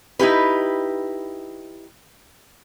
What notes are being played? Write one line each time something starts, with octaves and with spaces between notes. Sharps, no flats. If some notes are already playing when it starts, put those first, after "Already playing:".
D#4 E4 G4 B4